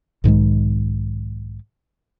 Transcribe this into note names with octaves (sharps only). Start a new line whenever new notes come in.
B1 G#2 D#3 G#3